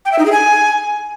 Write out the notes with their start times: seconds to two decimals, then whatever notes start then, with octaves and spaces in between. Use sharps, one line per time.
0.05 G5
0.12 E5
0.19 D#4
0.25 G#4
0.32 G#5